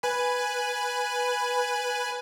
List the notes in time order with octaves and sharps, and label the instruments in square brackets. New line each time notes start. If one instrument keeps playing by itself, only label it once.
[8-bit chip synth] B4 G#5 B5